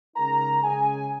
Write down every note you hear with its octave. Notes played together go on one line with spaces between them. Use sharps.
C#3 G#3 D#4 A#4 A#5
C#3 G#3 C#4 G#4 G#5